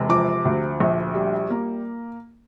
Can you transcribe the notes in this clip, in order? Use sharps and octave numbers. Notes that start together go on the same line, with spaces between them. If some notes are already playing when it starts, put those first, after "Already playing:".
Already playing: E1 C3
F3 D6
D2
A#1
G3
A#3